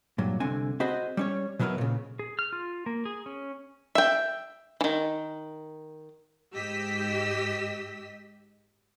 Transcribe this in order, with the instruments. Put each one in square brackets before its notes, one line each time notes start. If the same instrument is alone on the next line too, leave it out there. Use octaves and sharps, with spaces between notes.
[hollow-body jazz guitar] G2 A#2 F#3
C2 D3 C4 G#5
C4 F#4 G#4 C5 D#5 B5
G3 C#4 C#5
B2 F#3 B3 E4 A#4 B4
A#2 C#3
[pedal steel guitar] G#4
F6
F4
A#3
G#4
C#4
[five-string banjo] E5 G5
D#3 E3
[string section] G#2 G4 D#5 E6 B6